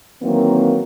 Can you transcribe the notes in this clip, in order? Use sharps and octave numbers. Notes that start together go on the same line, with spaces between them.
D#3 E3 F#3 A#3 C4